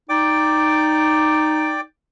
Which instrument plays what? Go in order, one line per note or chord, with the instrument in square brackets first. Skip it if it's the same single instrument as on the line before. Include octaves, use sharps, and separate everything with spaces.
[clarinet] D#4 [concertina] D5 G5 D6